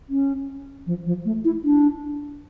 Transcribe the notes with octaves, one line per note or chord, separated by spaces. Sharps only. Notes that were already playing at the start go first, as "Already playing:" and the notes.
C#4
F3
F3
A3
E4
D4